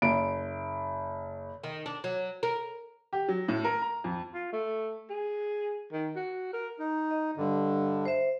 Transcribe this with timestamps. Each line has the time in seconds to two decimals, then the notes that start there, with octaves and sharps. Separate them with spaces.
0.02 F#1 D7
1.63 D#3
1.86 D4
2.04 F#3
2.43 A#4
3.13 G4
3.28 F#3
3.48 A2
3.64 A#4
3.82 A#5
4.04 F2
4.34 F4
4.53 A3
5.10 G#4
5.92 D#3
6.15 F#4
6.53 A#4
6.79 D#4
7.11 D#5
7.37 G2 D3
8.05 C5 E5